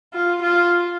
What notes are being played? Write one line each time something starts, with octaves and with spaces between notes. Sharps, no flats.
F4
F4